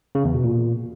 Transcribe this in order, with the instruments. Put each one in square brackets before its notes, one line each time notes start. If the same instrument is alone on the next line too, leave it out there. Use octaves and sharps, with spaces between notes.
[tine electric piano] C#3
E2
B2
A#2